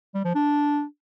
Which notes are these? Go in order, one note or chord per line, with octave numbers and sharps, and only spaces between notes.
G3
F3
D4